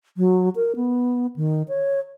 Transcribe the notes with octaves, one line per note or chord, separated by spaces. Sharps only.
F#3
A#4
B3
D#3
C#5